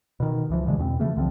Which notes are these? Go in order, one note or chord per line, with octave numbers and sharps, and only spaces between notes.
B2 D#3
C#2 E3 F3
G2 B2 D3 G#3
E2 B2 B3 C4
C#3 E3 F3 A3
C2 D3 F3 C4